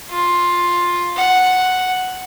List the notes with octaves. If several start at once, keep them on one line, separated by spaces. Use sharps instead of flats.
F4
F#5